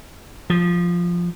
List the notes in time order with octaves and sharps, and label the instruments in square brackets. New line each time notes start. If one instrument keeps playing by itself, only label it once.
[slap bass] F3